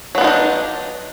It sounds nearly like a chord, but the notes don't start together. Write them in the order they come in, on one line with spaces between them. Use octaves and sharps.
F#3 B3 F4 D#4 D4